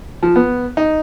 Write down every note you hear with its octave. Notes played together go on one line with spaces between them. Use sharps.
F3
B3
D#4